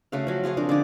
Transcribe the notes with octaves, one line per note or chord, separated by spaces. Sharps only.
C#3 A3 F#4 F5
F3 F#3
F4 G#4 C#5 F5
F3 C4 D4 A#4
D3 D#4 F4 D5